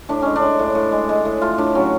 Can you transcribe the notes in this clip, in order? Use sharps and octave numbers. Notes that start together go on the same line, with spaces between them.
A2 D4
G#3 C#4
D4
G#3
A2
A2
G#3
G#3
A2
A3 F4
A2 D4
F#3 C#4